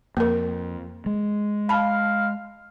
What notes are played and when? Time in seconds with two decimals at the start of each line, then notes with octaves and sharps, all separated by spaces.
0.17 F2 A#3 A#4
1.06 G#3
1.69 F5 A5 B5